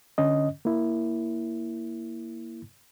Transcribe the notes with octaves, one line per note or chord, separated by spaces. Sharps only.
D3 C#4 D#5
A#3 E4